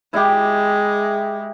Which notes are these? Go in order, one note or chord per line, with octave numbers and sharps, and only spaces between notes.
G#3 E4 G4